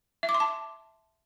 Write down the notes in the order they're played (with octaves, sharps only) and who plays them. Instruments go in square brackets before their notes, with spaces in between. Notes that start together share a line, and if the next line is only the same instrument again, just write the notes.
[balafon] E5
D6
C6
A5